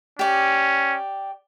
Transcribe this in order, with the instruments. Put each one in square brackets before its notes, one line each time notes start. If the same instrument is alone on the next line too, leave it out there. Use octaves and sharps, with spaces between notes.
[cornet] C#4 [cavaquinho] G4 D5